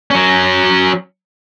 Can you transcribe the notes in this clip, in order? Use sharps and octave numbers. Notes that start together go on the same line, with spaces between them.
F#3 C#4